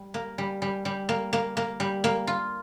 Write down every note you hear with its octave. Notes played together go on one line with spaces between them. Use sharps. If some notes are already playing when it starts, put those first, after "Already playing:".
Already playing: G3
A#3
G3
G3
G3
A#3
A#3
A#3
G3
A#3
F4